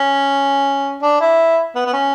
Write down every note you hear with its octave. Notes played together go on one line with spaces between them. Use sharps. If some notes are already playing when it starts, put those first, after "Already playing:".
Already playing: C#4
D4
E4
B3
B3
C#4